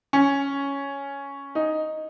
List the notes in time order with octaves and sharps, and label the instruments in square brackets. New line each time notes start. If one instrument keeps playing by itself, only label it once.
[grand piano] C#4
D#4